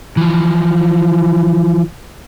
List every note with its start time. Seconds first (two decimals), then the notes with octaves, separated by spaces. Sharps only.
0.17 E3 F3